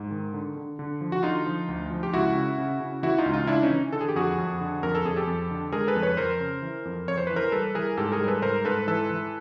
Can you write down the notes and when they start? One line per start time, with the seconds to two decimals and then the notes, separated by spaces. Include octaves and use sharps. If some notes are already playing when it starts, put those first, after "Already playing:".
Already playing: G#2
0.11 D#3
0.34 D3
0.56 D3
0.79 D3
1.01 F3
1.12 F#4
1.23 D3 D#4 F4
1.46 F3
1.68 D2
1.91 F3
2.03 G4
2.13 C#2 E4 F#4
2.35 C#3
2.58 C#3
2.80 C#3
3.02 E3 E4 F#4
3.18 D#4 F4
3.26 C#2
3.33 D#4 F4
3.47 C#3 D4 E4
3.63 C#4 D#4
3.70 E3
3.93 D3 A4
4.01 G#4
4.08 G4
4.15 F2 F#4 G#4
4.38 F2
4.61 D3
4.83 F2 A#4
4.95 A4
5.05 F2 G#4
5.16 G4 A4
5.27 F2
5.51 D3
5.72 G#3 G#4 A#4
5.88 A4 B4
5.95 F2
6.02 B4 C#5
6.17 F2 A#4 C5
6.40 C#3
6.62 E3
6.85 F2
7.08 F2 C#5
7.17 C5
7.27 E3 B4
7.36 A#4 C5
7.52 G3 A4 B4
7.75 E3 G#4 A#4
7.97 G#2 G4 A4
8.12 G#4 A#4
8.20 G3
8.28 A4 B4
8.42 G#2 A#4 C5
8.65 G#2 A4 B4
8.87 E3 A4 B4
9.10 E3